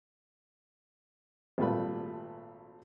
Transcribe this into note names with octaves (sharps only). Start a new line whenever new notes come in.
G#1 A#2 G3 A3 B4 B5